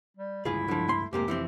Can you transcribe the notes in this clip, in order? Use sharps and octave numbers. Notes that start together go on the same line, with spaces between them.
G3
G1 C#2 G2 E4 F4 G#4
D3 F3
A3 C6
F1 G#2 C3 A#3 G4
E3 F3 C4